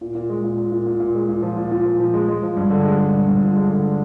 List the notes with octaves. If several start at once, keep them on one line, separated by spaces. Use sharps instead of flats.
A#2
A#2
G#3
A#2
A#2
A#2
A#2
A#2
G#3
A#2
F3
A#2
A#2
F3
F3
G#3
G#3
F3
G2
D3
G#3
G#3
G2
G2
F3
G#3
D3